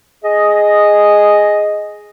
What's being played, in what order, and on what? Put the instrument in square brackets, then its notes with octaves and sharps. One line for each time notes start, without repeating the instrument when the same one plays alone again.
[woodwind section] G#4 D#5